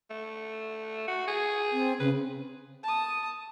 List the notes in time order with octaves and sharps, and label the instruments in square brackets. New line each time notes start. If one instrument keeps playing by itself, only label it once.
[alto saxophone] A3
F#4
G#4
[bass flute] C4
[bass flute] C#3 [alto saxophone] B4
[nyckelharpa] A5 D#6